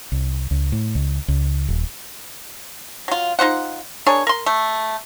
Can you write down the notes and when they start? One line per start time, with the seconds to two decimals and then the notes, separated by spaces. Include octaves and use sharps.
0.12 C2
0.51 C#2
0.72 A2
0.95 C#2
1.28 C#2
1.68 D#1
3.08 F#3 F4
3.39 D#4 F4 C5 F#5
4.06 D4 G#4 A#4 C#5
4.27 A#4 C6
4.46 A3